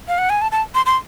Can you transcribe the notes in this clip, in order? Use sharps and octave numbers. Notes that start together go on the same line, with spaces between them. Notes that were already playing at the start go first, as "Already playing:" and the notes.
F5
F#5
G#5
A5
A5
C6
C6